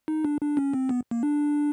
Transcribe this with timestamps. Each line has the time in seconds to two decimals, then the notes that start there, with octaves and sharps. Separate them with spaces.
0.08 D#4
0.25 D4
0.41 D4
0.57 C#4
0.74 C4
0.89 B3
1.11 A#3
1.23 D4